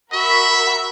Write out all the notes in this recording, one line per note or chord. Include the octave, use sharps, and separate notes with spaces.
F#4 A#4 E5 B5